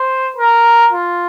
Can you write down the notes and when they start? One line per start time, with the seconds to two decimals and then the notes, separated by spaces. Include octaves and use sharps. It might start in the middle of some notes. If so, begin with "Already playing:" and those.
Already playing: C5
0.37 A#4
0.92 F4